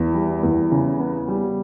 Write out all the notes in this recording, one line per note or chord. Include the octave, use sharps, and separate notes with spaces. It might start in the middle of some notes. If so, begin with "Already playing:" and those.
Already playing: E2
G3
E2
C#3
B3
G3